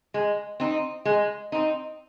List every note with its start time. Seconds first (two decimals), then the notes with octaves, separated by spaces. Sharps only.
0.14 G#3
0.60 C4 D#4
1.05 G#3
1.52 C4 D#4